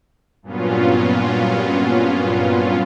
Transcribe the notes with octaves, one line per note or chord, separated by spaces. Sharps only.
G2 A#2 F#3 B3 C#4 F4